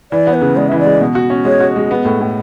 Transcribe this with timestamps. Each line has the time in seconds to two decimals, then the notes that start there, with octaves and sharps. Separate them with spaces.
0.12 E3 D5
0.27 B3
0.34 B4
0.41 C#3
0.57 G#3 D5
0.68 E3 E5
0.79 D5
0.85 G#3
1.01 B2
1.15 F#4
1.30 C#4
1.45 G#3 C#5
1.60 F#4
1.76 G#3
1.91 B3
2.05 A2
2.21 A2